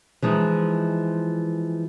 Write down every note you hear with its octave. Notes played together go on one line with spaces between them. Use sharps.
E3 F3 G#3 D#4